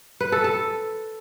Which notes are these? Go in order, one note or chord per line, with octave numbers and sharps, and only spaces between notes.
B4
A4
A4